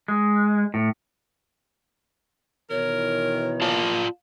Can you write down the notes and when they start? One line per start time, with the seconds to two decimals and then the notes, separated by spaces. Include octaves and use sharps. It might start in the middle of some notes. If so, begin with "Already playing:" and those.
0.08 G#3
0.74 A2
2.70 B2 D#3 E3 A#4 C#5
3.62 A#3 F4 D5 A5